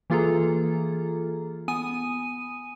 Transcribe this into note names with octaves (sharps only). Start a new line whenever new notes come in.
E3 A#3 F4 G#4 A4 A#5
B3 G#5 D#6 D#7